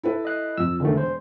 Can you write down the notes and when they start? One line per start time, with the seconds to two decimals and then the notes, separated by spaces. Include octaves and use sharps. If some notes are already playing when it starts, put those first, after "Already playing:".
0.03 E4 A4 B4
0.25 D#5 F#6
0.58 F2 E6
0.80 E1 D3 D#3 A3
0.97 C5